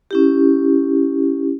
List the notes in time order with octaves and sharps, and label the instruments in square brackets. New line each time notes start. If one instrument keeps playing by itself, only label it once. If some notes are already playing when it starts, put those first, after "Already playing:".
[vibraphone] C#4 E4 G4